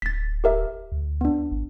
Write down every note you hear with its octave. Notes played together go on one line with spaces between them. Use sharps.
D1 A6 B6
G4 A#4 E5
D2
B3 D4
G#1